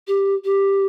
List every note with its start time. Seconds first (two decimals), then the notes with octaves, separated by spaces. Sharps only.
0.08 G4
0.45 G4